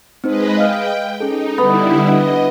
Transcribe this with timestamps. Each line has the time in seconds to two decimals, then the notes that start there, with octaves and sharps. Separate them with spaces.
0.24 G#3 C4 D#4 B4 C5 D#5
0.57 D#5 F5 G5 F6
1.20 C#4 D#4 G#4 A4
1.58 D3 G3 B3 E4 A4
2.07 D4 D#5 E5 F#5